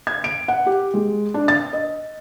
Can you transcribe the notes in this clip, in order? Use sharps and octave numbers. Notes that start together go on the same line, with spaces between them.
G#6
D7
F#5
G4
G#3
D4
A6
D#5